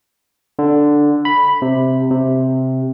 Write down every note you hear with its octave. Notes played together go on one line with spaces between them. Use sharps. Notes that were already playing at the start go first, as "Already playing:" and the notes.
D3
B5
C3
C3